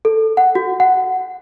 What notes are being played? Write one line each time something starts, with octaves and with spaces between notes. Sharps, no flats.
A4
F#5
F#4
F#5